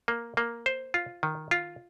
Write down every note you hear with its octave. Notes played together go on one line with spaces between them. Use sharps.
A#3
A#3
C5
F4
D#3
F4